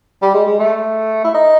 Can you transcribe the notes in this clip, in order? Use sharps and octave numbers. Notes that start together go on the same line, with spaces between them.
G3
G#3
G#3
A3
E4
D#4